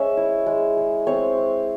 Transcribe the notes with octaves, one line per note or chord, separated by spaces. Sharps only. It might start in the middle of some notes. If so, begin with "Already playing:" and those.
Already playing: G#3 C#4 C#5 E5
E4
G#3
G#3
C4 C#5
G#3